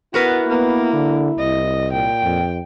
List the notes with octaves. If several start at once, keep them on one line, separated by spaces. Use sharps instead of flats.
B3 E4 F#4 A#4 B4
A#3 B3
D3
C2 D#5
A#2 G5
F2